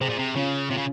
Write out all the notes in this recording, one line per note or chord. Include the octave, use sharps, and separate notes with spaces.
C3 G#4 C5
A#2
C3
C#3 C#4 F4
C3 C#4 F4
C#3